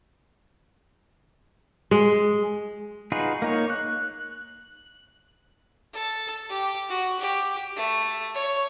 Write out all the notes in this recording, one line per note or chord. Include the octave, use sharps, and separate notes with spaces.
G#3
D#4 F4 F#4 G#4 B4
A#3 D#4 C#5
F#6
A4
G4
F#4
G4
A3
C#5